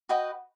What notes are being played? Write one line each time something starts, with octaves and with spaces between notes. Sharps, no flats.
F#4 B4 D#5 G5